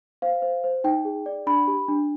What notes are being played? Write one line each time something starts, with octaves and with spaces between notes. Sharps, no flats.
C5 F5
C5
C5
D#4 G5
G#4
D5
D4 B5
G4
D4